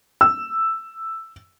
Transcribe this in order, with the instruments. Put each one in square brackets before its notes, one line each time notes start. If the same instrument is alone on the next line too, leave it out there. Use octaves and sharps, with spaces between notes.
[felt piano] E6